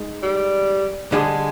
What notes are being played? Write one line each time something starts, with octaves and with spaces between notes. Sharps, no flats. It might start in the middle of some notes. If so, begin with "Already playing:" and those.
Already playing: G#3 D#4
G3
D3 G3 G#3 D4 G#4